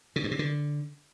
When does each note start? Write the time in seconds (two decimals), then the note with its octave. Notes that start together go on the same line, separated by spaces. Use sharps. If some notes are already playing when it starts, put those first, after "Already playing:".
0.16 C#3
0.24 G2
0.31 C3
0.39 D3